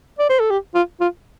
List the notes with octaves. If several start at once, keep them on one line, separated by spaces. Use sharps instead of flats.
D5
C5
A4
G4
F4
F4